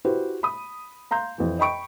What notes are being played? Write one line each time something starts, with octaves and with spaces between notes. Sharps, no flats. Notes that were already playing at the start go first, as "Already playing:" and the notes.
E4 F#4 G4 B4 C5
B5 D#6
F5 A#5 C6 G6
F2 E3
D#5 G5 B5 C#6 D7